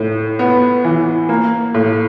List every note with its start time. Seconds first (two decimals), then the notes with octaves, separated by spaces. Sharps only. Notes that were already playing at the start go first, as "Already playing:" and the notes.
Already playing: A2
0.39 B3
0.84 E3
1.29 A#3
1.74 A2